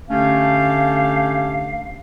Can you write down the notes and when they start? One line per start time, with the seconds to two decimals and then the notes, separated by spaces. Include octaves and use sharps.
0.09 D3 A3 C#4 D4 G4 F5